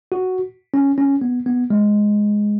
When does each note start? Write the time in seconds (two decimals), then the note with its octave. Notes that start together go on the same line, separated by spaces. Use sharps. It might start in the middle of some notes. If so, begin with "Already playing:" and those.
0.12 F#4
0.74 C#4
0.98 C#4
1.21 B3
1.46 B3
1.70 G#3